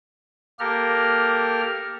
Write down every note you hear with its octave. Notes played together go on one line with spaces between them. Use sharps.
A#3 G4 A4 A#4 F6